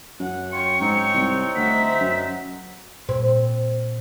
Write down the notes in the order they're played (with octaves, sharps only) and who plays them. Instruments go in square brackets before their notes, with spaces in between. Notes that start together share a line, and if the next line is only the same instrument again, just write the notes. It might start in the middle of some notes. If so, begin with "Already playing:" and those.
[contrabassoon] F#2 [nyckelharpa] F#5
[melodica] F4 [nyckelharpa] C#5 G5 [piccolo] C#7
[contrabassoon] G#2 [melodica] C4 D#4
[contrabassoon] C2
[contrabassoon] D2 [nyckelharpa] E5 F#5 [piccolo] B6
[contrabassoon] F#2
[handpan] A#2 [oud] C4